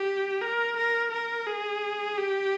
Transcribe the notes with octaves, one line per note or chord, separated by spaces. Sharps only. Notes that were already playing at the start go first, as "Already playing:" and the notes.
Already playing: G4
A#4
A#4
A#4
G#4
G4